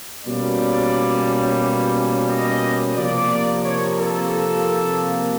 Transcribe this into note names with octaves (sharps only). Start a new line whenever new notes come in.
B2 G3 A#3 C#4 D5
D#5
C3 F3 A#3 D5
C#5
A4